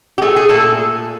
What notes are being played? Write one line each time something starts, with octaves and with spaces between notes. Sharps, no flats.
G4
A3 G#4
G#4
A#2 A4